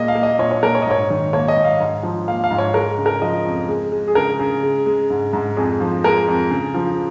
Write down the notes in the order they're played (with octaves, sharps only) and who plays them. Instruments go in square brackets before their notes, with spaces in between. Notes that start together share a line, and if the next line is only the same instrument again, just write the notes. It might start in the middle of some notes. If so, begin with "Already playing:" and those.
Already playing: [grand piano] A#2 G#3 A#3 D#5
F5
A#3
D#5
A#2 C#5
C#5
A#2 A#4
C#5
D#5
G#2 C#5
D#3
A#3 C#5
D#5
G#2
F5
G#2
F3
A#3 F5
F5
G#2
C#5
G#3 A#4
C#3
A#4
F3 D#5
F2
G#3
G#3
G#4
C#3 A#4
C#3
G#3
G#3
G#2
G#2
F2 G#4
F3
G#3 A#4
F2
C#3
F3